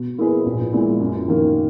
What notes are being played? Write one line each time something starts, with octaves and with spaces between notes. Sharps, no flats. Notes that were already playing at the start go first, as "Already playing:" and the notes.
Already playing: B2
A#3 E4 G#4 B4
A#1
A#2 G#3 B3 E4
F#2
D#3 A#3